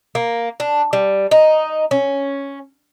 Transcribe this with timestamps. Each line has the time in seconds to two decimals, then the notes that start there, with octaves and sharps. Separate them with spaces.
0.15 A#3
0.60 D4
0.93 G3
1.31 D#4
1.91 C#4